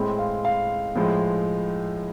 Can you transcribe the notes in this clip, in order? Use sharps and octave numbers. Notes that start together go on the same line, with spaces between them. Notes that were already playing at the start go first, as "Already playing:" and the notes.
Already playing: A2 G#3 C4
F5
F5
A2 F3 G#3